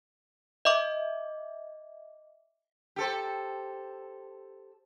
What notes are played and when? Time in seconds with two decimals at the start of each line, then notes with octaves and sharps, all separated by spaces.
0.65 D#5 E5 D6
2.96 G4 A4 C5